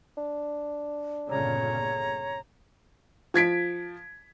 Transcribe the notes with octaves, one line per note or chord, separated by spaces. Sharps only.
D4
G1 A#2 C#3 C#5 A#5
F3 G#6 B6 D7